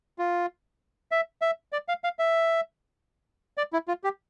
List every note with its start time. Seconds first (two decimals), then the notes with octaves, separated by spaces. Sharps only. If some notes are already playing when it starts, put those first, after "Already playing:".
0.18 F4
1.12 E5
1.42 E5
1.72 D5
1.88 F5
2.04 F5
2.19 E5
3.58 D5
3.73 E4
3.88 F4
4.04 G4